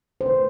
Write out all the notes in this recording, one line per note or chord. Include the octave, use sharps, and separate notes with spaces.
C5
D3 A3 E4 B4